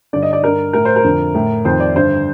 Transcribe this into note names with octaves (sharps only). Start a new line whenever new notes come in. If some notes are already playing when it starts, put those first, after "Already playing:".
G2 D3 D5
D#5
D5
G2 D3 A#4
A2 A#4
C5
A#4
F2 D3
A2
F2 D#3 C5
D5
G2 D3 C5